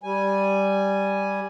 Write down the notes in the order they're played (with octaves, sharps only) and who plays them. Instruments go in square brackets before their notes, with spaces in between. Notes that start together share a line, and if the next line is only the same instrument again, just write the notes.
[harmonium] G3 G#5